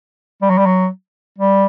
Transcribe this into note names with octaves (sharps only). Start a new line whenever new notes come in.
G3
F#3
G3
F#3
G3